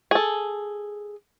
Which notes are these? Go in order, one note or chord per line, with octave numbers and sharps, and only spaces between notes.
G#4 A4